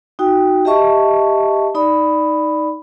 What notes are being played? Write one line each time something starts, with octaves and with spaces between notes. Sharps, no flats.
D#4 F#4 G5
G4 D#5 E5 A5 C#6
D#4 D5 B5